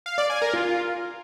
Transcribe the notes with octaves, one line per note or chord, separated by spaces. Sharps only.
F5
D5
G#5
A#4
F4